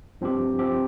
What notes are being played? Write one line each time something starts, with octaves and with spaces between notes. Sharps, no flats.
G2 F3 C4 G4
F3 C4 G4